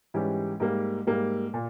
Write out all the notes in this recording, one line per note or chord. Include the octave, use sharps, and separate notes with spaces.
G#2 E3 G3 C#4 G4
G#2 G3 A#3
G#2 G3 A#3
A#2